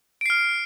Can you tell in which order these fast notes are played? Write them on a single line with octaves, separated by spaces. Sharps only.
D7 C7 F6